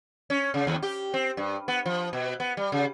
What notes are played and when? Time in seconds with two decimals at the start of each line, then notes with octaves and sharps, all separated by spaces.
0.30 C#4
0.54 C#3
0.67 D#2
0.83 G4
1.14 C4
1.37 G2
1.68 B3
1.86 F3
2.13 B2
2.40 B3
2.57 G3
2.72 C#3